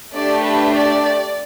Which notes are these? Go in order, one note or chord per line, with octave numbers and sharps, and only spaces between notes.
A3 D4 G4 D5
B4
D5